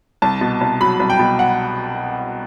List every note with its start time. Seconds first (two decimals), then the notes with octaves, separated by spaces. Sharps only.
0.22 C2 A5
0.41 B2
0.61 C2
0.80 F#3 B5
1.00 C2
1.10 G5
1.19 B2
1.39 F#5